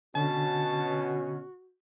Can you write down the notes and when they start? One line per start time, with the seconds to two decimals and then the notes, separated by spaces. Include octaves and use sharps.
0.15 B2 D3 C#4 F#4 A5